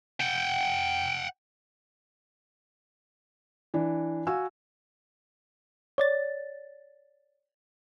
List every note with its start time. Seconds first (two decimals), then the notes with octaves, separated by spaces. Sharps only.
0.20 F#5 G5
3.74 E3 D4
4.27 F#4 F5 G#5 E6
5.98 C#5 D5 A6